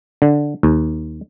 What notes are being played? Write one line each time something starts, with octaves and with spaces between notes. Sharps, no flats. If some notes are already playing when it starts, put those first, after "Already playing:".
D3
D#2